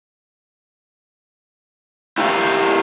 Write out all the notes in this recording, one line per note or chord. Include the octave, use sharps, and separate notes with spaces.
E4 G4 A#4 F5